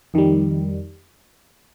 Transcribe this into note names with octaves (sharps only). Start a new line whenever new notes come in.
F2 D#3 G3